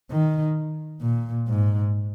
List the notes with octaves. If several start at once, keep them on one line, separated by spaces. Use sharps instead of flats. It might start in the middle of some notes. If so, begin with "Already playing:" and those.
D#3
A#2
G#2